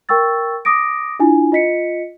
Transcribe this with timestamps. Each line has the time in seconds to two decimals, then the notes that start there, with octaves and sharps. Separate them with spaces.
0.09 A#4 G5 C#6 E6 A6
0.65 D6 D#6 A#6 D7
1.19 D4 E4 F4 G#5
1.52 F4 D#5 B6 C#7